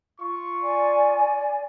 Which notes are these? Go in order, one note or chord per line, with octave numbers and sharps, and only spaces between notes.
F4 C#6
D5 G#5